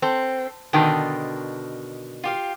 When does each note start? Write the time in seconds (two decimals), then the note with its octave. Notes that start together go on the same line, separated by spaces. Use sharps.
0.02 C4 A4
0.73 B2 D3 D#3 G5 A5 C6
2.24 F4 G4 F5